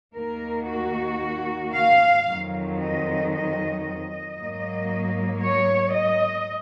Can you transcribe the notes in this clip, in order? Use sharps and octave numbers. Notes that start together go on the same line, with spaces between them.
D#2 D#3 A#3 A#4
F#4
F5
F2 D#3 F#3
D#5
D#5
D#5
G#2 F#3 A#3
C#5
D#5